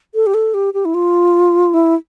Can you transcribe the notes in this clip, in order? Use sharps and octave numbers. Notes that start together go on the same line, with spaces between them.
A4
G4
A4
G4
G4
E4
F4
E4